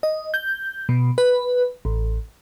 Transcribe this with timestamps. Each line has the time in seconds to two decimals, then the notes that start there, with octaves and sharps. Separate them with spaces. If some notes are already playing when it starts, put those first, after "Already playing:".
0.03 D#5
0.34 G6
0.89 B2
1.18 B4
1.85 A1